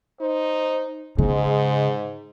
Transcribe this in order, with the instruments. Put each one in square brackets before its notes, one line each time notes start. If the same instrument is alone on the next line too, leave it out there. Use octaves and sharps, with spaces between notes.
[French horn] D#4 [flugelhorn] C5
[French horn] G#2 [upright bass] C#3 [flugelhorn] G#3